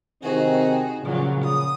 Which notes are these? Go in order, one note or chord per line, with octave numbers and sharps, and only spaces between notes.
C3 D#3 C4 D#4 F#4 G#4
A#2 C#3 F3 F#3
D#6